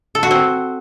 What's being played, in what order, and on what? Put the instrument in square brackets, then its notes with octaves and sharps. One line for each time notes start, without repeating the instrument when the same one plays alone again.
[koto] A4
F#4
C4